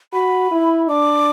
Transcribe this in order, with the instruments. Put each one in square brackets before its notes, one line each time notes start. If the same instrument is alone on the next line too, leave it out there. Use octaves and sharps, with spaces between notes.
[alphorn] F#4 [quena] B5
[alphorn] E4
[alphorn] D4 [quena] D6